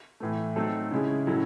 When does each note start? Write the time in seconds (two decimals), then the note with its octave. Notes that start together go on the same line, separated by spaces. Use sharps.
0.20 A2 E3 A3
0.56 F#3 A3 C4 D#4 A4
0.91 C#3 G#3 C#4 E4 G#4
1.27 A2 F#3 C#4 E4 A4